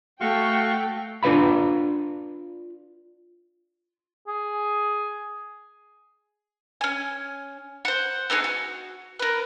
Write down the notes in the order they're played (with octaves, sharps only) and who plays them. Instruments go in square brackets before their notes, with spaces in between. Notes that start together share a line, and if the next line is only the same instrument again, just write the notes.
[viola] A3 [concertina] F#4 F5 C#6 [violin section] G5
[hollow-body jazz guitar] D4 F4 B4 F5 B5
[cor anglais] G#4
[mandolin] C#4 G#5
C5 F#5
A3 B3 D#4 G#4
F#4
A#4 B4